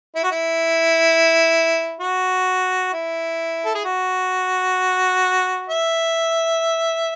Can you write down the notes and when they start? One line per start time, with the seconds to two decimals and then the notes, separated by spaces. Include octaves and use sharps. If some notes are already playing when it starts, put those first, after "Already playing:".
0.15 E4
0.24 F#4
0.31 E4
2.00 F#4
2.93 E4
3.65 A4
3.75 G#4
3.85 F#4
5.70 E5